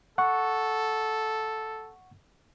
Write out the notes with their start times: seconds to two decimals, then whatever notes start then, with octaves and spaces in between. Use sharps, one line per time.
0.18 A4 F#5 C#6